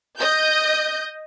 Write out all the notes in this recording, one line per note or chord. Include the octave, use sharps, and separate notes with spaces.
D#5 G6